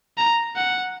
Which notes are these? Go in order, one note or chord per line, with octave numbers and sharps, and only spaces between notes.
A#5
F#5